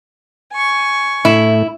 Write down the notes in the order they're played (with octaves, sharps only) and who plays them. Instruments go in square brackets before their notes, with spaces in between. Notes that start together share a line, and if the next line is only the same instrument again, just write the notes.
[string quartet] G#5 C#6
[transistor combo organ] A2 A3 [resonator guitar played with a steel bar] E4